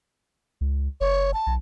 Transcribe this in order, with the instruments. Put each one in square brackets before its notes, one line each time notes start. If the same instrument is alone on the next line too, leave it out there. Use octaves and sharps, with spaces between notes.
[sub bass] C#2
[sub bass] F#1 [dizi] C#5
[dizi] A5
[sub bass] B1